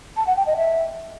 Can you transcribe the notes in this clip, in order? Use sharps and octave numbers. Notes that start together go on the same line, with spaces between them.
A5
F#5
G5
D#5
E5